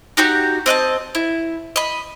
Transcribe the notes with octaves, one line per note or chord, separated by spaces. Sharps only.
D#4 F#4 G4 A#5
C4 D#5 F#5 A5
E4
D#5 B5